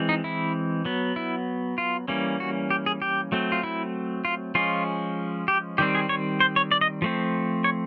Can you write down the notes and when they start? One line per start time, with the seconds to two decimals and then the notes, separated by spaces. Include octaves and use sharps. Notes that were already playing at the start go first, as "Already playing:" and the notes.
Already playing: E3 G#3 C4
0.09 D#4
0.24 E4
0.85 F#3 B3
1.16 E4
1.78 F4
2.08 E3 G3 A#3 C#4
2.40 F#4
2.70 G4
2.86 G#4
3.02 G4
3.32 F#3 A3 C4
3.52 F4
3.63 E4
4.25 F4
4.55 F3 G#3 C#4 F4
5.48 G4
5.78 D#3 G3 C4 G4
5.95 G#4
6.09 C#5
6.40 C5
6.56 C#5
6.72 D5
6.81 D#5
7.02 F3 A3 C4
7.64 C#5